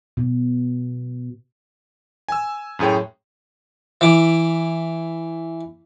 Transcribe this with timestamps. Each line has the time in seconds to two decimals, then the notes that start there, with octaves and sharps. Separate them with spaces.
0.17 B2
2.28 G#5 E6
2.79 F#2 A2 G#4 C#5 G5
4.01 E3 D6